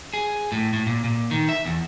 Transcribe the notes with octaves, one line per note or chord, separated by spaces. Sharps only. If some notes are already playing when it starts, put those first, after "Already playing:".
G#4
A2
A2
A#2
A#2
D#3
E5
E2